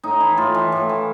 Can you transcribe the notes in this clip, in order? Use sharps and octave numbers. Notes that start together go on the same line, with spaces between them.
A2 D#4
E3 E4
A2 F4
E3
A2
E3